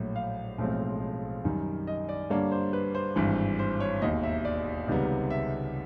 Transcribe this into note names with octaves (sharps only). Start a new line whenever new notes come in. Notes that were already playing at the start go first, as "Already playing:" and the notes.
Already playing: A#1 A2 F#3
F5
B1 A2 F3 G#3 C4
F#2 D#3 G3
D#5
D5
G2 D3 G3 A#3 D4 C#5
C5
B4
C5
G#1 G2 E3
C5
C#5
E1 D#2 D#3 D#5
E5
D5
C#2 C3 D#3 G3 B3
E5